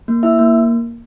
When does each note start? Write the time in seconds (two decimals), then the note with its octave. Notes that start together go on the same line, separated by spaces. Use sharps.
0.08 A#3
0.23 E4 E5
0.39 A#3